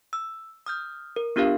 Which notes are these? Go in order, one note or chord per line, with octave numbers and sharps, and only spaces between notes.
E6
D#6 F6 G6
A#4
B3 D4 F4 G4 A#4 F5